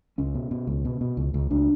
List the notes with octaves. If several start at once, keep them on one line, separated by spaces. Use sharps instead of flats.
C#2 C#4
B2
B2
C#2
B2
B2
C#2
C#2
C#2 D4